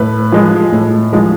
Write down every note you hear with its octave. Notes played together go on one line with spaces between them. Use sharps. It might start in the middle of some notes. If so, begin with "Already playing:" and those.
Already playing: A2 B4
F3 G#3
A2
F3 G#3